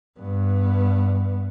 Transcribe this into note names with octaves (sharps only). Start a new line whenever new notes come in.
G2 B3